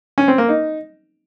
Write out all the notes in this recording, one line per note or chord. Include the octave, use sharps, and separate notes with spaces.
C#4
C4
A#3
D#4